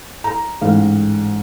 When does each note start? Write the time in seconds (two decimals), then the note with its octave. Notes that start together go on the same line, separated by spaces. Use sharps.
0.24 A#5
0.61 A1 G#2 F5